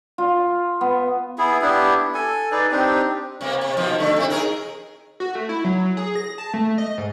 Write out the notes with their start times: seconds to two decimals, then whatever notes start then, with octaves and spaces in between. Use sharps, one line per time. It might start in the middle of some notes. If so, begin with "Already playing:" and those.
0.18 F4
0.81 B3
1.38 B3 E4 G#4
1.61 B3 D4 E4 G4
2.14 A4 G#5
2.52 D#4 G#4 B4 D5
2.71 C4 D4 D#4 G4
3.41 C3 A#3 B3
3.61 C3
3.77 B2 D#3 F3
3.99 D3 A3
4.16 C3 E4
4.30 D#4 G#4 A#4
5.20 F#4
5.35 A3
5.49 E4
5.64 F#3
5.97 G#4
6.16 A#6
6.38 A5
6.54 A3
6.78 D#5
6.98 G#2